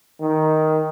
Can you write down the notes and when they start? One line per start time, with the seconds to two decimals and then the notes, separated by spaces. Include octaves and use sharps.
0.20 D#3